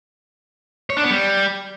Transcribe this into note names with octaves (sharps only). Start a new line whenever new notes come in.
C#5
D4
B3
G3